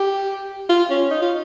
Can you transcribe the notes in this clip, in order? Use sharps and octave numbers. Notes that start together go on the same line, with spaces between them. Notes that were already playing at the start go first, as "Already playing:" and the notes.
Already playing: G4
F4
C#4
D#4
F4